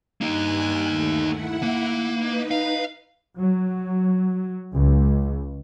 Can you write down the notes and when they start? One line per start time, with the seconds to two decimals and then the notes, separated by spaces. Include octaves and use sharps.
0.21 G2 A#3 D#4 G#5 F#6
0.85 D#2 D#3 A3
1.25 E4 F#5
1.63 A#3
2.13 D#4 B4
2.51 F5
3.37 F#3
4.74 C#2